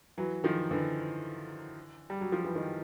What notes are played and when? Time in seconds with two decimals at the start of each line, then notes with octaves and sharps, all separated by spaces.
0.18 E3 F#3
0.44 D#3 F3
0.71 D3 E3
2.10 G3
2.21 F#3
2.32 F3
2.45 E3
2.55 D#3